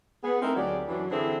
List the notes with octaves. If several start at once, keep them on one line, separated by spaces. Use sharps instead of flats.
B3 G#4
A3 C4 D#4 E4 A#4 C5
D2 F#3 G4 G#4 D5
F#2 E3 F#3 D4
D3 E3 C4 E4 G#4 A4